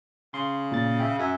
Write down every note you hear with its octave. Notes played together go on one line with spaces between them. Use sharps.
C#3 C6
A#2 A6
E5 G5
F#2 E5 G#5